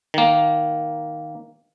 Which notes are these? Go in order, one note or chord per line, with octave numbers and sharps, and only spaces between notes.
D#3 A#3